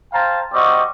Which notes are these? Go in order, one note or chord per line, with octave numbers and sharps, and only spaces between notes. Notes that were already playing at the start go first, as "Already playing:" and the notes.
C5 F5 G5 A5 A#5
G3 C4 F#4 D#5 C#6 D6